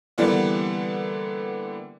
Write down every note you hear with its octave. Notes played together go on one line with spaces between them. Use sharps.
D3 E3 G3 A#3 B3